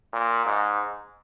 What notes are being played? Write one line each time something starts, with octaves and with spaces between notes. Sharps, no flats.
A#2
G#2